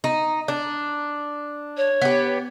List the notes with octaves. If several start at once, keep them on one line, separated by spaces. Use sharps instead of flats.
D#4
D4
C#5
B3 G4